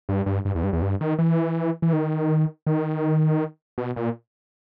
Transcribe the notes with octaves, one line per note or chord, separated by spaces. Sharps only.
G2
G2
G2
E2
G2
E2
G2
D#3
E3
E3
D#3
D#3
B2
A#2